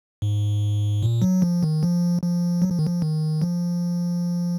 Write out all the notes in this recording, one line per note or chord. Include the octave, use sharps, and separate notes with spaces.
G#2
A#2
F#3
F3
D#3
F3
F3
F#3
F3
D#3
F3
D#3
F3